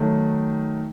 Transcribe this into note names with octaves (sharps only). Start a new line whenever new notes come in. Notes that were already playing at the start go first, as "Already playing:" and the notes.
Already playing: D#3 F#3 A3